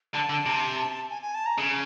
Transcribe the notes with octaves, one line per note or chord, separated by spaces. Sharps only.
D3 A5
D3
C3
G#5
G#5
A5
A#5
C#3